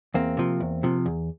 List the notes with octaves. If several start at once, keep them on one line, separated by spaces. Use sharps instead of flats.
E2 A#3 C4
C3 F3
E2
C3 F3
E2